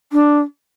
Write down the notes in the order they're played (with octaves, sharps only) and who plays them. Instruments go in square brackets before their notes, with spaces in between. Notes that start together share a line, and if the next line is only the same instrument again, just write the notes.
[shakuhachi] D4